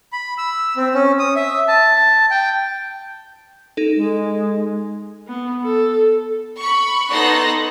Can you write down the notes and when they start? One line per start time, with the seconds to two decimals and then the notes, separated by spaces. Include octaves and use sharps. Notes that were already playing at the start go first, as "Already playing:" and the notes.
0.13 B5
0.38 E6
0.77 C4
0.94 C#4
1.19 D#6
1.36 E5
1.68 A5
2.31 G5
3.77 D#4 A4
3.95 G#3
5.27 B3
5.64 A4
6.59 B5 C#6
7.11 B3 D#4 A4 C6 F#6 A#6